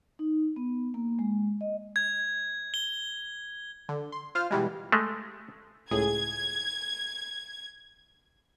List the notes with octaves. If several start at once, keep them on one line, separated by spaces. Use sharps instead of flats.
D#4
B3
A#3
G#3
D#5
G#6
G7
D3
C6
F4 C5 F5 F6
B2 E3 G3 G#3
G#3 A3
C#2 A2 G#4 G#6